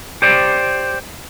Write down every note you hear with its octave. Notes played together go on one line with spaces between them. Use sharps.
G4 C5 D5